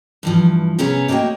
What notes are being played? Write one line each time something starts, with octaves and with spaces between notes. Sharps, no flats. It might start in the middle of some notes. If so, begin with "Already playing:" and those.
G2 E3 F3
C3 B3 C#4 G#4 C#5 A#5
A3 A#3 F#4 C#5 D#5 G5